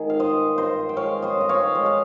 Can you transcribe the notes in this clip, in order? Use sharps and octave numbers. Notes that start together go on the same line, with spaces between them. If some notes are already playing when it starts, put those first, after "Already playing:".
Already playing: G#2 D#3 G#4
F5
G2 C5 D#5
G2 C5 D#5
G5
G#3 C#5 F5
C5 D#5
G2
D#5
C#5 F5
G#3 D#5
F5